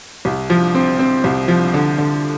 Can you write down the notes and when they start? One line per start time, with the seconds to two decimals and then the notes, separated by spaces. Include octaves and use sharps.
0.25 C2
0.50 F3
0.75 C4
0.99 C4
1.24 C2
1.48 F3
1.74 D3
1.98 D3